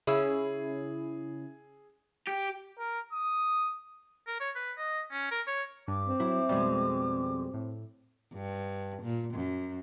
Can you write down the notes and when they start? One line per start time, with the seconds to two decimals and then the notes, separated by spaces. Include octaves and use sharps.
0.07 C#3 C#4 E4 G#4 E6
2.27 G4
2.78 A#4
3.13 D#6
4.27 A#4
4.40 C#5
4.55 B4
4.78 D#5
5.11 C#4
5.31 A#4
5.47 C#5
5.88 G2 D6
6.07 C4
6.20 F#3 E4
6.49 F2 B2 G3 G#3
7.54 A2
8.34 G2
9.02 A#2
9.35 F#2